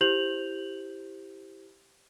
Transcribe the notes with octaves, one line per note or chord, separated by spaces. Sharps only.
E4 G4 C5 G6 F7 F#7